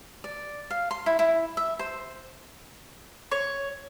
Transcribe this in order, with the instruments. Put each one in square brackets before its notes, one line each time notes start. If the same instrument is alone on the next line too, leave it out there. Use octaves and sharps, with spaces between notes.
[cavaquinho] D5
F5
C6
E4
E4
E5
C5
[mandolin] C#5